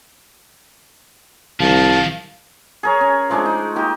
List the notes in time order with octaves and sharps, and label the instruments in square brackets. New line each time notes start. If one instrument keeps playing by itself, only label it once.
[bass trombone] C2 [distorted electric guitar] D#3 F3 [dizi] F5 [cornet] A5
[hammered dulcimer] G#4 A#4 C#5
C#4
F3 G#3 A3 D4
D#4
A#3 D#4 G4